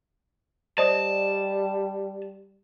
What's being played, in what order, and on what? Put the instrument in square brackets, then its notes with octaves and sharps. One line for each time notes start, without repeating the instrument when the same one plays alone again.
[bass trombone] G3 [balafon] C5 [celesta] D5 D#5 D#6 [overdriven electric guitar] A5